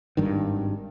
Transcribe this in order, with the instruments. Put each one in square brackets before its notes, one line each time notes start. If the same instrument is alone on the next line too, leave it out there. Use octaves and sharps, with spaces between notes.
[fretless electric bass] G#1 G2 D#3